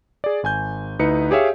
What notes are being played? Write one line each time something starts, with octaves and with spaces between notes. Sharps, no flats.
G#4 D5
G#1 G#5 G6
D2 D#4 E4 B4 C#7
G4 G#4 C#5 E5 F5